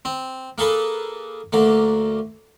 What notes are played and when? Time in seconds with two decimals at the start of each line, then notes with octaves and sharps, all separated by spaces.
0.05 C4
0.58 A#3 G#4 A4 B4
1.53 D2 D3 A#3